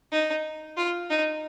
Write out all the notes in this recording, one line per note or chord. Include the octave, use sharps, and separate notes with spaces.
D#4
F4
D#4